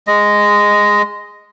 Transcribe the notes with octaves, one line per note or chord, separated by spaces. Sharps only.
G#3 D#5